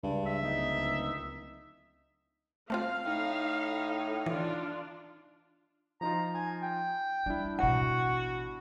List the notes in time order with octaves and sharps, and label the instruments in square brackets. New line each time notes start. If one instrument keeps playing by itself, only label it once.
[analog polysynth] C#2 [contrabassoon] G2
[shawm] E5
[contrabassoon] D1 [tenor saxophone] D#4
[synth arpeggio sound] A3 C4 F4 [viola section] F5
[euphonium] A2 [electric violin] D#4
[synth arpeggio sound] E3 [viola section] D4 F4
[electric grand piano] F3 D#4 F4 [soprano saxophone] A#5
[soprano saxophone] G#5
G5
[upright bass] G3 [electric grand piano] D4 E4
[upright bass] A1 B2 [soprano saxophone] F#4 [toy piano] F#5